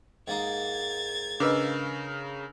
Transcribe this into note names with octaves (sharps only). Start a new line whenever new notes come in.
G#2 A#3 D#4 G#6 A6
C#3 D4 A#4 B4 D#5 E6